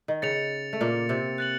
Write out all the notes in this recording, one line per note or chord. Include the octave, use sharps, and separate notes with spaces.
D#3
C#3 A6 C#7 F7
A3
A#2 A#3
C3 C4
F#6 A6 C#7 F#7